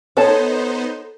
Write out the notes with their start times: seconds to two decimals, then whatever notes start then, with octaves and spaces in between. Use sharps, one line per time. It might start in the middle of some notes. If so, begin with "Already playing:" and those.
0.17 B3 D#4 A4 C5 C#5 A5